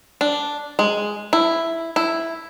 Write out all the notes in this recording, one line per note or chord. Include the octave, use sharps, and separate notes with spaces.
D4
G#3
E4
E4